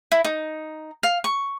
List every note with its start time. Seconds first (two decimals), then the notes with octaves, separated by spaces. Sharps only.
0.12 E4
0.24 D#4
1.03 F5
1.24 C#6